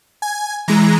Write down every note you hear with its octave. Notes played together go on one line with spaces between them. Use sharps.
G#5
E3 G#3 A#5